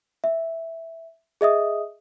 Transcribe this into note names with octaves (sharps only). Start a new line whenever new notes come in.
E5
G#4 D#5 E5 D#6